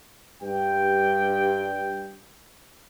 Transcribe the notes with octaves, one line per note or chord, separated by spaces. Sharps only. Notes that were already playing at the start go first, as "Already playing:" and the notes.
G2 G5